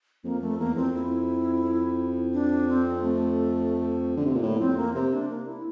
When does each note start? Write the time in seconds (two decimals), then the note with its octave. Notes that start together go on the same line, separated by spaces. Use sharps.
0.24 F2 A#3
0.41 F2 A3
0.59 E2 A#3
0.76 F2 C4
0.94 E4
1.63 F2
2.33 D4
2.68 C4
3.03 A3
4.17 D3
4.25 C3
4.34 A#2
4.42 A2 A#3
4.53 A#3
4.59 F2 C4
4.77 A#3
4.95 C3 C4
5.12 D4
5.30 A#3
5.47 E4